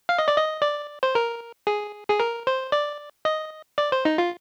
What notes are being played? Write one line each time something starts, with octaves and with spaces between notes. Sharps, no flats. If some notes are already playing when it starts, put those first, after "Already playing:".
F5
D#5
D5
D#5
D5
C5
A#4
G#4
G#4
A#4
C5
D5
D#5
D5
C5
D#4
F4